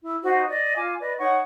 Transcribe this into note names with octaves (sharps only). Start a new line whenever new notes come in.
E4
D#4 F#4 C5
D5 D#5
F4 G#5 D6
B4 D5 D#5
D#4 C#5 F#5 C#6